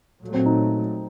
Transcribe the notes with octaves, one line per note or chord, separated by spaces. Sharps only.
A#2 F#3 A3
C4
D#4